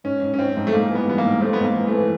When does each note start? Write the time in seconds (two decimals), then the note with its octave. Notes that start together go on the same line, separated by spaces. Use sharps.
0.04 G#2 C#4
0.22 G#2
0.34 C#4
0.38 G#2 C4
0.56 G#2
0.67 A3
0.73 G#2 A#3
0.90 E3
0.95 B3
1.07 G3 B3
1.18 A#3
1.24 G#2
1.41 A3 C4
1.53 B3
1.58 G#2
1.64 A#3
1.75 E3
1.87 E3 A3